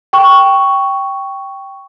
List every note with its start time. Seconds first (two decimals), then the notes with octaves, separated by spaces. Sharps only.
0.13 G5 C#6